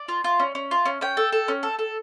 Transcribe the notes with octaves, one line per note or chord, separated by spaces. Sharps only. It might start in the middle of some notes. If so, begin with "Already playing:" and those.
Already playing: D5
F4
F4
C#4
C#4
F4
C#4
C#4 G5
A4
A4
C#4
A4
A4